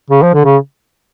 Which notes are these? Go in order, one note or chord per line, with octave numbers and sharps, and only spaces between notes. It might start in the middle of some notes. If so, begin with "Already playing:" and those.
C#3
F3
D3
C#3